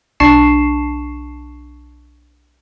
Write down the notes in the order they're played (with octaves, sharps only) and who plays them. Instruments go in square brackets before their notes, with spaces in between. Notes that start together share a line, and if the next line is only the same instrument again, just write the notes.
[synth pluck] B1 D4 A5 C#6 C7 E7